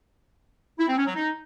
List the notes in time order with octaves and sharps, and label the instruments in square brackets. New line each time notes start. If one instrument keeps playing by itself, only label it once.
[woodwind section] E4
C4
C#4
F#3
D#4